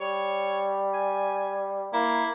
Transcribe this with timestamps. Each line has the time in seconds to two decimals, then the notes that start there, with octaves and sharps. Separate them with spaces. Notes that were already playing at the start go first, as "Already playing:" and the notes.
0.01 G3 C#5
0.94 G#5
1.93 A#3 E4